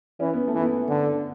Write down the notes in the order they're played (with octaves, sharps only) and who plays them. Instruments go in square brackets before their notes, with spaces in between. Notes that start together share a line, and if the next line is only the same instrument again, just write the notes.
[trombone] E3 [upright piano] C#4
[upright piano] B3
A3
[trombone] E3
[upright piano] B3
[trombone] D3